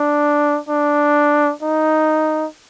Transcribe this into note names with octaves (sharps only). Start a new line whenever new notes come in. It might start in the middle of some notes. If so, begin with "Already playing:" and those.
Already playing: D4
D4
D#4